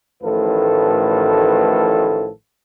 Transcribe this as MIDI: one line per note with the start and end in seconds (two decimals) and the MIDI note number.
0.23 2.28 33
0.23 2.28 45
0.23 2.28 51
0.23 2.28 53
0.23 2.28 69
0.23 2.28 71